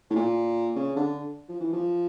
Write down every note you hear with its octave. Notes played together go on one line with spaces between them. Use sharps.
A2
A#2
C#3
D3
F3
E3
F3